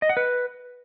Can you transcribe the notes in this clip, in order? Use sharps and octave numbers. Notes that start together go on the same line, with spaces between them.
D#5
F#5
B4